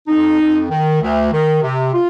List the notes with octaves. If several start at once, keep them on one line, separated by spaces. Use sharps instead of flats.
F2 D#4
F2
D#3
D2
D#3
C3
F4